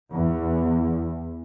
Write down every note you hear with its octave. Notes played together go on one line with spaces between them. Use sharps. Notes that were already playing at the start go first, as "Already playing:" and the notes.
E2